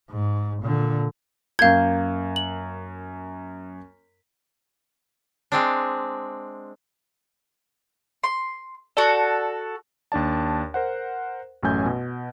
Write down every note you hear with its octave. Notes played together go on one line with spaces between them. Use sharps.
G#2
A#2 D3
F#2 A#3 F5 G6 G#6
F#7
G#3 C4 D4
C6
F#4 A4 D5 A5
D#2 D4 D5 A5
A#4 C5 F#5
A1 F#2 A3 C#4 G#5 G6
B2